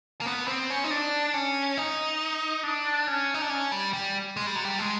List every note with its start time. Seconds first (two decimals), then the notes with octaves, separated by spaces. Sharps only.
0.21 A#3
0.26 B3
0.48 C4
0.70 C#4
0.84 D#4
0.91 D4
1.34 C#4
1.77 D#4
2.63 D4
3.07 C#4
3.34 D#4
3.42 D4
3.50 C#4
3.72 G3
3.93 G3
4.37 G#3
4.46 G3
4.56 F#3
4.65 G3
4.79 G#3